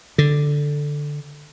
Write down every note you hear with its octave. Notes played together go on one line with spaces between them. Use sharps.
D3